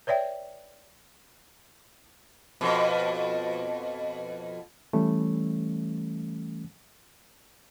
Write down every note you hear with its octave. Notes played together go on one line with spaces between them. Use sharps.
B4 C#5 D5 E5 G5
F2 B2
E3 G3 A3 C#4